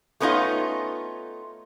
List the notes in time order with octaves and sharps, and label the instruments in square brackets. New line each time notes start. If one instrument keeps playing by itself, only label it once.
[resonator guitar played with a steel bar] A3 B3 C#4 D#4 F4